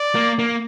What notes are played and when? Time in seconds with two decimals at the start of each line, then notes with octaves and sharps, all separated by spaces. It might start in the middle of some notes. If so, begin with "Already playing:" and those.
Already playing: D5
0.15 A#3
0.39 A#3